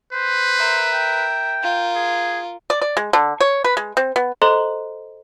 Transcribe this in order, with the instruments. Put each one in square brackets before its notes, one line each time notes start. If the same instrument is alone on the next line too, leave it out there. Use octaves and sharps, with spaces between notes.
[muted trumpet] B4 [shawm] C5
[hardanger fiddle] A#4 E5
[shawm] G5
[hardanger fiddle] F4 A#4
[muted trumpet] G#4
[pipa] D5
D5
G#3
D3
C#5
B4
G#3
C4
B3
[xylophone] A4 C5 D#5 A#5 C6 F#6